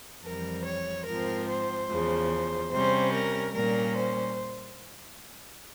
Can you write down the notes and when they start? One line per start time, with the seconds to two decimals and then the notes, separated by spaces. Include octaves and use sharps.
0.23 F2 E3 G3 C4 A#4
0.65 C#5
1.06 G#2 F3 C4 A#4
1.48 C5
1.89 E2 C#3 F3
2.71 C3 G3 C#4 C5
3.13 A#4
3.54 A#2 G3 A#3 C#4 A#4
3.95 C5